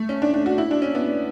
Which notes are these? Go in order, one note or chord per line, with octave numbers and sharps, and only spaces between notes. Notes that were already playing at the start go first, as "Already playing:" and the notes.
Already playing: A3
C#4
D4
D4
F#4
E4
D4
C#4
B3